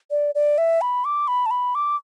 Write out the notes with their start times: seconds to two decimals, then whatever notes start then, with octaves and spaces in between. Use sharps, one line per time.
0.11 D5
0.35 D5
0.58 E5
0.81 B5
1.05 D6
1.28 B5
1.46 A5
1.51 B5
1.75 D6